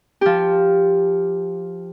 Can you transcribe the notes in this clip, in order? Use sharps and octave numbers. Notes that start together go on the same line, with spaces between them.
F3 G4